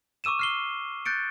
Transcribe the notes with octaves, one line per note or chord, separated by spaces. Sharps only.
C#6 D6 E6 D#7 E7
F6 C7 G7
F#6 G6 A6 C#7 D7